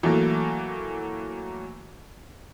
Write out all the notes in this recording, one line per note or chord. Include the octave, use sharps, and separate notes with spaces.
E3 F#3 A3 A#3